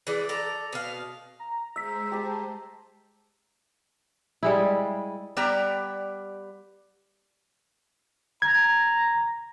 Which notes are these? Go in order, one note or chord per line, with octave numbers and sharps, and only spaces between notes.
E3 G#3 D5
A4 D5 A#5
B2 F5
A#5
G#3 C5 E5 E6 B6
G4 A5 A#5
G3 G#3 E4
G3 B3 G4 D5 G5 A#5
A#5 G#6